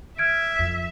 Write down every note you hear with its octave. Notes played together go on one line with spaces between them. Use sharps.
E5 F6 G#6 D7
F2